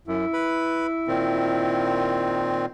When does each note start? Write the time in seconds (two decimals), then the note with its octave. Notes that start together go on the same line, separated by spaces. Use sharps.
0.08 F#2 E4
0.33 B4 B5
1.08 A#2 D#3 C4